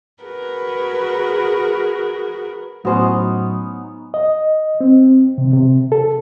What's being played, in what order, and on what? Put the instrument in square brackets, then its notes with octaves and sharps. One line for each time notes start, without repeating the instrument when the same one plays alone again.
[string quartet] F#4 G#4 A#4 B4
[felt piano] A2 A3 [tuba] F#3 [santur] B3 C#4 D#4 [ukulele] F#4 C5
[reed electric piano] D#5
C4
C3
C3
A4